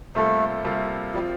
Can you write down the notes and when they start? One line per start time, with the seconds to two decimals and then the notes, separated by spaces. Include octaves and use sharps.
0.15 C3 G3 A3 A#3 F4 A4
0.64 C3 G3 A#3 F4 A4
1.14 F3 G3 C4 F4